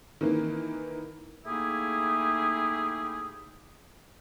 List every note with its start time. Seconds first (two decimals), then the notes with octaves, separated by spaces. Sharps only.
0.21 D#3 E3 A#3
1.45 A3 A#3 D#4 E4 G4 G#4